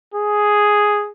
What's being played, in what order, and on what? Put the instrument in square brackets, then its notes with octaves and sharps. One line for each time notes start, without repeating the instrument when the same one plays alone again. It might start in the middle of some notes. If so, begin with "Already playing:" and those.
[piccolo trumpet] G#4